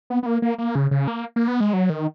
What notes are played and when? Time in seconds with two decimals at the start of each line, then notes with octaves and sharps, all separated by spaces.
0.10 B3
0.23 B3
0.26 A#3
0.42 A#3
0.58 A#3
0.75 C#3
0.91 C#3
1.08 A#3
1.36 A#3
1.48 B3
1.60 G#3
1.73 F#3
1.90 D#3